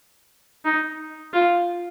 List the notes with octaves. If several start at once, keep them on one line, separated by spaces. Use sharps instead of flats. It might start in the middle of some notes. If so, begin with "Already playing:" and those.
D#4
F4